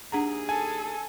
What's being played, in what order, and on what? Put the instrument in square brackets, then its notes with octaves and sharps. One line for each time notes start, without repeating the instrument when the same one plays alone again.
[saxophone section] D#2 G#4 [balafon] D4 F#5 A#5
[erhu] A4 [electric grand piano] G#5